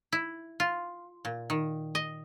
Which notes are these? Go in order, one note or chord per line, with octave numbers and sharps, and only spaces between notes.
E4
F4
A#2
D#3
D#5